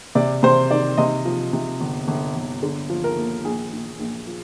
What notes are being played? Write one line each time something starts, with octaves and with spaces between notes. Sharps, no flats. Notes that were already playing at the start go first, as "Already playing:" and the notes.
C3 D5
C3 C5
D#3 D5
C3 D#5
F3
C3
G1
G1
G1
D3
F3
A#4
D#2
A#1 G#4
A#1
A#1
F3